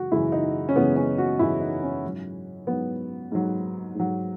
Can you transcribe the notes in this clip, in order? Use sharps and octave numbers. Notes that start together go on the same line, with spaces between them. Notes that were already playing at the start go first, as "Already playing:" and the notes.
Already playing: F#2 C#3 E3 G#3 F#4
F#2 C#3 E3 G#3 E4
D#4
C#4
F#2 C#3 E3 G#3 B3
C#4
F#4
F#2 C#3 E3 G#3 E4
D#4
C#4
G#2 F#3
G#2 F#3 B3
G#2 F#3
G#2 F#3